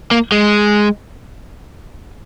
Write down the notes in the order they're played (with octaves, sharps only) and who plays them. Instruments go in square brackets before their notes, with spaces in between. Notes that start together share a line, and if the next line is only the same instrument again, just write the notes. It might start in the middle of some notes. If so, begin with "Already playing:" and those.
[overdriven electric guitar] A#3
G#3